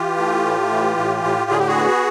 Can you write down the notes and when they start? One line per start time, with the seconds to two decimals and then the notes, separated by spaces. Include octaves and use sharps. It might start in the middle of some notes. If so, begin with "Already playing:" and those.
Already playing: E3 F4 G4
0.18 A3
0.45 A2
0.72 E3
0.98 A2
1.24 A2
1.50 D3 G#4
1.59 G4
1.67 F#4 G#4
1.77 B3